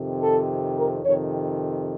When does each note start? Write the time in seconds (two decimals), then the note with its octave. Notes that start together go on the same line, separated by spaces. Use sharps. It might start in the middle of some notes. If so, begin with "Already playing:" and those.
Already playing: F2 C3 D#3
0.20 A4
0.77 A#4
1.04 F2 C3 D#3 C#5